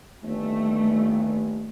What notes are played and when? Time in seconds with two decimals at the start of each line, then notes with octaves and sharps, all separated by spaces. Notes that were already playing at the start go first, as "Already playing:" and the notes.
0.23 G1 D#2 A3